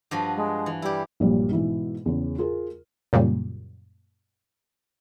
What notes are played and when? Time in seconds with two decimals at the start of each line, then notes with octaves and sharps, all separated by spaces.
0.11 G2 F3 F#4
0.36 G#3
0.66 E3
0.82 G3 E4 G4
1.20 A#1 G2 A#2 F#3 G3
1.51 G#2 B2 E3 E4
2.06 E2 C#3
2.38 F4 G#4 A#4
3.13 F#2 A#2 C#3 G3